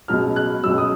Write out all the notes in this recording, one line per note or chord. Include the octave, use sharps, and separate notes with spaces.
C#2 B2 F#3 F6
F#6
C#2 B2 F#3 E6
D#6